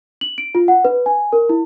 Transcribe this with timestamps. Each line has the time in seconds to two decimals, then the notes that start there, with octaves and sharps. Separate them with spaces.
0.21 F#7
0.38 D7
0.55 F4
0.68 F#5
0.85 B4
1.06 G#5
1.33 A#4
1.49 E4